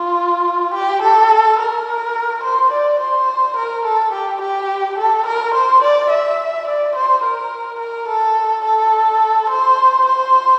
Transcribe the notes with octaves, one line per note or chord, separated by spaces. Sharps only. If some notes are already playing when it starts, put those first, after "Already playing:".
Already playing: F4
G4
A4
A#4
C5
D5
C5
A#4
A4
G4
G4
A4
A#4
C5
D5
E5
D5
C5
A#4
A#4
A4
A4
C5
C5